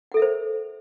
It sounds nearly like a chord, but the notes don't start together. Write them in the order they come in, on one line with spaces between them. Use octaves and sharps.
F#5 A4 E5 A#4 C5